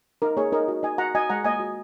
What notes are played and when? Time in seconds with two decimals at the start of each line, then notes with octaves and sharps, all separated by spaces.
0.22 D#4 A#4
0.37 A#3 G#4 C#5
0.52 D#4 A#4 D#5
0.68 F#4
0.83 D#4 D#5 G#5
0.98 F#4 F#5 A#5
1.15 F#4 D#5 G#5
1.30 G#3 F#5 A#5
1.44 A#3 D#5 G#5
1.60 F#4